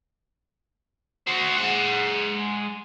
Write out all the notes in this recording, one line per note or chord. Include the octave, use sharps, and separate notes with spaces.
F#4 C5
G#3 F#5